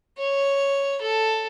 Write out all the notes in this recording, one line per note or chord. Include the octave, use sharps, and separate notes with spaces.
C#5
A4